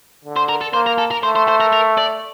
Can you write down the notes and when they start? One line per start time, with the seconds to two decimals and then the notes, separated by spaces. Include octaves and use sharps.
0.25 D3
0.37 C5
0.49 A#4
0.61 A4
0.74 A#3 C5
0.86 A#4
0.98 A4
1.11 A#4
1.23 A3 C5
1.36 C5
1.48 C5
1.61 A#4
1.73 A#4
1.98 D5